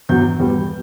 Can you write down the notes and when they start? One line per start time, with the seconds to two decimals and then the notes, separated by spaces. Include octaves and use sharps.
0.09 E2 B2 F#3 G6
0.40 E2 B2 G3